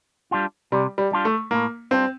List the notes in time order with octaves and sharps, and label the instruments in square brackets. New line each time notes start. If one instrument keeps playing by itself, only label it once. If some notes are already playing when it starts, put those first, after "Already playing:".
[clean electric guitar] G3 D4 F4
[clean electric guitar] C3 [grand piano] G3
[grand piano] G3
[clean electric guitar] G3 D4 F4
[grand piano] A3
[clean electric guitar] A2 [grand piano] A#3
[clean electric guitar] G3 D4 F4 [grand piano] C4